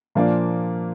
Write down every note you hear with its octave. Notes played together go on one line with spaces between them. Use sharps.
A#2 F3 A#3 D4